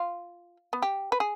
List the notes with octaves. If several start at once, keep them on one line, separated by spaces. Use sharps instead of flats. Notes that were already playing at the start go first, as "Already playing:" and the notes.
Already playing: F4
B3
G4
B4
G#4